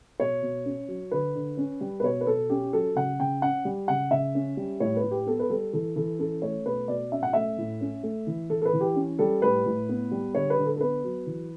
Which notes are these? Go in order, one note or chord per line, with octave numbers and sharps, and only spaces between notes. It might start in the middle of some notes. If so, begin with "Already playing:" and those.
B2 C#5
B2
C#4
F#3
D3 B4
D3
C#4
G3
B4
B2 C#5
B4
B2 A4
C#4 G4
F#3 A4
C#3 F#5
C#3 G5
C#4 F#5
G3
C#3 F#5
C#3 E5
C#4
G3
A2 C#5
B4
A2
G4
B3 A4
B4
G3 A4
E3 A4
E3 A4
C#4 A4
A3 C#5
B2 B4
B2 D5
C#4 E5
F#5
A3 E5
A2
C#4
A3
E3
E3 A4
A4
B4
E3
G4
C#4
G3 A4
A2 B4
A2
B3
G3
D3 C#5
B4
D3
A4
A4
B3 B4
F#3
E3